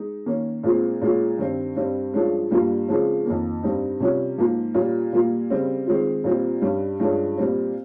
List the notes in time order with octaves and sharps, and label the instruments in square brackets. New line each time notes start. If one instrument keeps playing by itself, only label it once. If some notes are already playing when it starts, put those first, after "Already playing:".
Already playing: [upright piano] G#3 D#4
D#3 A#3 C#4
A#2 G#3 C4 F4
A#2 G#3 C#4 F4
G2 D#3 G3 C4
G2 G3 C4
G2 F3 G#3 C#4
G2 G3 A#3 F4
C#3 F3 G#3 C4
F2 D#3 A#3
G2 G3 C4 D#4
C3 G3 C#4 F4
G#2 F3 A#3 F4
A#2 G3 C#4 F4
A#2 G3 A#3 F4
C#3 G3 C4
D#3 G#3 C4 F4
A#2 G3 C4 F4
G2 G3 C#4
G2 F3 G#3 C#4
A#2 G3 C4